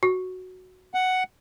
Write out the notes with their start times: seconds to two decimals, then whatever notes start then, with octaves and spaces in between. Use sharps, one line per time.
0.03 F#4
0.94 F#5